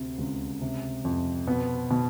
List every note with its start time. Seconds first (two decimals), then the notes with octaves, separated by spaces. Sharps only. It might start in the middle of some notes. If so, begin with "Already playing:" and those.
Already playing: D2 C3
0.18 C#2
0.61 C3
1.05 F2
1.47 B2 B3
1.91 B2